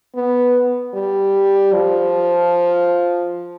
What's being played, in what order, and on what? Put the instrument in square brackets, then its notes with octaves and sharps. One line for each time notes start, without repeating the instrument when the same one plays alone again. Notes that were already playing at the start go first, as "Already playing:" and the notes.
[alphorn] B3
G3
F3